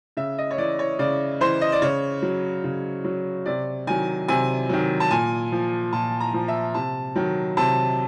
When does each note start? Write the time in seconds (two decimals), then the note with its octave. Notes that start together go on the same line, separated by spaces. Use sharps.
0.17 C#3 E5
0.38 D#5
0.51 C#5
0.58 E3 D5
0.79 C#5
0.99 C#3 D5
1.41 E3 C5
1.61 D#5
1.72 D5
1.82 C#3 C#5
2.22 F#3
2.64 C#3
3.04 F#3
3.46 C3 D5
3.87 D#3 F#3 G#5
4.28 C3 G#5
4.69 D#3 F#3
5.00 A5
5.11 A#2 G#5
5.52 F3
5.93 A#2 A5
6.20 A#5
6.34 F3
6.48 E5
6.74 C3 A5
7.16 D#3 F#3
7.57 C3 A5